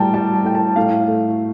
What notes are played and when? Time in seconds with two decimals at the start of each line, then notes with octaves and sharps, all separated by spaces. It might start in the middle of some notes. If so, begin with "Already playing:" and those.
Already playing: A2 G3 G5 A5 A#5
0.14 G3 A5
0.35 A5
0.44 A2 G5
0.55 A5
0.76 A2 F5
1.08 A3